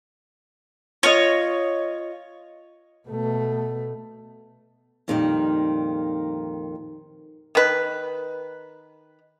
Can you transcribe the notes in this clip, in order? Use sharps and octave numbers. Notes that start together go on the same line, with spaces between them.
F4 C#5 D#5
B2 A3
F2 A#2 D#3 G3 B3 D#4
D#3 B4